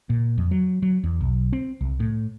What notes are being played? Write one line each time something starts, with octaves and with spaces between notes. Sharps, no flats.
A#2
F2
F#3
F#3
E2
B1
C4
C2
A2